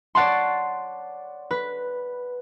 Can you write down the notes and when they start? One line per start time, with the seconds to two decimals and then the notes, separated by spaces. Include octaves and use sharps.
0.15 C#5 D5 F#5 A5 C6
1.51 B4